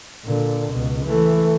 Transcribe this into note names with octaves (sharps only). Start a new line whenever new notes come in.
A#2 D3
C#2 B2
E3 A3